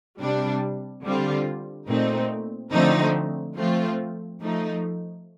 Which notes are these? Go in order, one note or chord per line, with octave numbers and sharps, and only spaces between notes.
C3 G3 D4
D3 G3 C4 F4
A#2 A3 C4 D#4
D3 F3 A3 C4 D#4
F3 A3 C4 F4
F3 A3 D#4